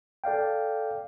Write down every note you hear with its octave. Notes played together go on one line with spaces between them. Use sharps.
A4 D5 F5 G5